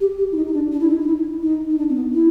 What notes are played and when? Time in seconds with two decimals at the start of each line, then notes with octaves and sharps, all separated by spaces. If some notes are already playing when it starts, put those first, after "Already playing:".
0.01 G4
0.18 G4
0.32 E4
0.36 D#4
0.47 D#4
0.54 D4
0.72 D4
0.80 E4
0.89 D#4
1.00 D#4
1.07 E4
1.43 D#4
1.70 D#4
1.78 D4
1.89 C4
1.95 B3
2.14 E4